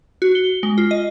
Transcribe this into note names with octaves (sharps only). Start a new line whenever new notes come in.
F#4
G7
G#3
F4
D#5